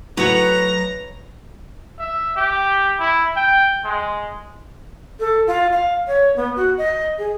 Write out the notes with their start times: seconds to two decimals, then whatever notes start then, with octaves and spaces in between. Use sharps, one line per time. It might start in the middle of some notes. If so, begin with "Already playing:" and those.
0.17 A2 F#3 F#4 B4 C#5 A#5 C#7
1.99 E5
2.36 G4
3.00 E4
3.37 G5
3.85 G#3
5.20 A4
5.47 F4
5.72 F5
6.07 C#5
6.36 B3
6.56 F#4
6.78 D#5
7.18 G#4